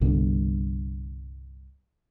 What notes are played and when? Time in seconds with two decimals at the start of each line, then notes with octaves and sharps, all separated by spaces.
0.01 C2 G2 B2 D3